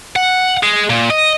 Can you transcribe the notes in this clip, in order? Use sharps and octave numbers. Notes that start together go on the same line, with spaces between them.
F#5
G#3
A#2
D#5